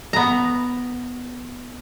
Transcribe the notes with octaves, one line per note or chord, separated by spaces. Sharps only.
B3 A#5